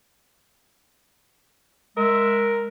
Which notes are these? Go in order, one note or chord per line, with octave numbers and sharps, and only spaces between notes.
G#3 A#4 E5